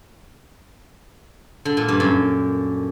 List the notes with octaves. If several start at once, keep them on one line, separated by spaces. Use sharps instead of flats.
D3
A#2
G2
F#2